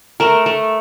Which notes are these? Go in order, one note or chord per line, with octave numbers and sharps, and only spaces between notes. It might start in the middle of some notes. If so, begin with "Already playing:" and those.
A3 A#4
A3